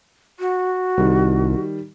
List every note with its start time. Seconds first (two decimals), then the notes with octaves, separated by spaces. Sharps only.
0.39 F#4
0.98 C2 D#3 G3